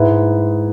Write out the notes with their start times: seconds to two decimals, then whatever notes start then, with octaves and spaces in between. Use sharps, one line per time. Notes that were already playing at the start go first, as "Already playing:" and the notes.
Already playing: G#2 G#3 E4 B4